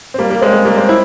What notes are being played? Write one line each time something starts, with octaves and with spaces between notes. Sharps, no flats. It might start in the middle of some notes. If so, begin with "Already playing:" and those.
C4
G3 A#3
G3 A#3
G#3 C4
G#3
G3 A#3
G#3 C4
C4 E4